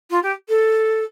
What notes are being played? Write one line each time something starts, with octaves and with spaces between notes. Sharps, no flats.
F4
G4
A4